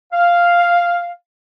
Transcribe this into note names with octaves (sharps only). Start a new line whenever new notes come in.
F5